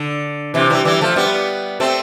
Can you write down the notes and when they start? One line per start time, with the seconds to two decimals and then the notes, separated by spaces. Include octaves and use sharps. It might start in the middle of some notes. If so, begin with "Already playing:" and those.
Already playing: D3
0.54 C3 E3
0.70 E3 G3
0.85 E3 G3
1.01 F3 A3
1.16 G3 B3
1.80 A3 C4